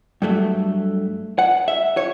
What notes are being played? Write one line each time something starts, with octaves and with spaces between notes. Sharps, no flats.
G2 F#3 A3
F#5
E5
C#5